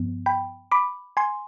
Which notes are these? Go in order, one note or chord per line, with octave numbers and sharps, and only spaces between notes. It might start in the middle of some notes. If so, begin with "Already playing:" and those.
Already playing: G2 F3 B3
G5 B5
B5 D6
G#5 C6